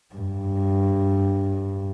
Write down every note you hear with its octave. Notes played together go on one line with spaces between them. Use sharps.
G2